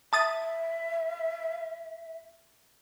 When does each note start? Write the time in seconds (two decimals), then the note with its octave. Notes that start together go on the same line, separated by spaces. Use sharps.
0.13 E5 A5 D#6 A6